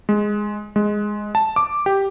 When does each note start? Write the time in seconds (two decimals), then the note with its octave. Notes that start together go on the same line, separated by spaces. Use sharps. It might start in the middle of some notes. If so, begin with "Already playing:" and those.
0.09 G#3
0.76 G#3
1.35 A5
1.56 D6
1.86 G4